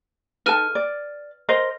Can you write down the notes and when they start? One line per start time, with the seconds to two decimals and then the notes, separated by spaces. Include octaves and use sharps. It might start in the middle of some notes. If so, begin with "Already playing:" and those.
0.46 D#4 A4 B4 A5 F6 D#7
0.75 D5
1.49 A#4 C5 D#5